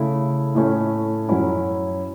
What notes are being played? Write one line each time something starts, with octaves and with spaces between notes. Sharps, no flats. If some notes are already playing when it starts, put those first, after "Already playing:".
Already playing: C#3 A3 E4
A2 A3 C#4 E4
F#2 F#3 C#4 E4